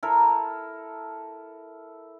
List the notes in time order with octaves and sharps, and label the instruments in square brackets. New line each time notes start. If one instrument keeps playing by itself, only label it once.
[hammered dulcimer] E4 A4 A#4 E5